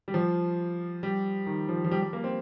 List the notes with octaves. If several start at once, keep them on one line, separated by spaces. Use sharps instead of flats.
G3
F3
G3
D#3
F3
F3
G3
G3
A#3
C4